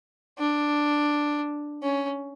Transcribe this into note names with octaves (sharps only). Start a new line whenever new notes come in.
D4
C#4